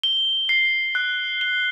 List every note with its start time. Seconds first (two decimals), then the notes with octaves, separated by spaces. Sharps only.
0.03 G7
0.49 C7
0.95 F#6
1.41 G7